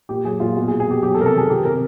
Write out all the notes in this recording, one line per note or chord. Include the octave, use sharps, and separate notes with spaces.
A#2 G4
F#3 G#4
A#2 F4
B2 F#4
G#4
B2
G#4
B2 G4
F#3 G4
A4
C3 A#4
A4
D#3 G#4
F3 G4
C3 A#4